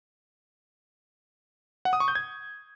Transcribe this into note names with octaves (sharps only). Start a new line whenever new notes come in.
F#5
D#6
C#6
G6
G#6